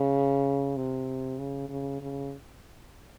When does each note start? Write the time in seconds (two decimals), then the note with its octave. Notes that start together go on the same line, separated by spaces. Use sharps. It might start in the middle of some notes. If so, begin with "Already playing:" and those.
Already playing: C#3
0.76 C3
1.39 C#3
1.69 C#3
2.01 C#3